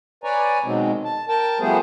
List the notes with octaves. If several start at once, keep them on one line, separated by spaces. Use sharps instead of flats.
B4 C#5 D5 G#5 A#5
B2 D#3 F#3 G#3 C4
A5
A#4 G5 A5
F3 G3 A3 B3 G#4 C5